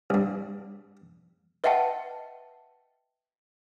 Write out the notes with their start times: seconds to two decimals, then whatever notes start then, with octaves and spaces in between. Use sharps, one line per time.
0.10 C2 G2
1.64 B4 D#5 E5 F#5 G5 A5